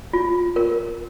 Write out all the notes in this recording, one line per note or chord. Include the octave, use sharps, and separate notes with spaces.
F4
A#4